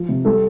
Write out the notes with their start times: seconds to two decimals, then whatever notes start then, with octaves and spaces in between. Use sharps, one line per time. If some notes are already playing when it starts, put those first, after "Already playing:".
Already playing: F3
0.09 C3
0.25 G3 A4